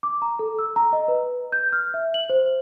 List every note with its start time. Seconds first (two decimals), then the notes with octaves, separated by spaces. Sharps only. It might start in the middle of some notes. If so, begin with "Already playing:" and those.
0.03 D6
0.22 A#5
0.39 A4
0.59 E6
0.76 A#5
0.93 D#5
1.08 B4
1.52 G6
1.72 F6
1.94 E5
2.14 F#7
2.30 C5